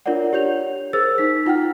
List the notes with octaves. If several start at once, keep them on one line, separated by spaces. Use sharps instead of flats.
D4 F4 A#4 C#5 D5 F#5
G4 C#5 G6 F7
G#4 A#4 C5 E6 A6
D#4 B6
D#4 F4 F#5 G5 F6